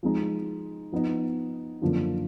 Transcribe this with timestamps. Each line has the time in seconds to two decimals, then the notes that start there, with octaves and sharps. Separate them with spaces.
0.03 F3 G#3 D#4
0.92 F3 B3 D#4
1.81 F#2 D3 F3 A#3 F4